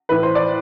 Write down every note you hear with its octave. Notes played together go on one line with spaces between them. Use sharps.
A2 E3 B4
C5
D5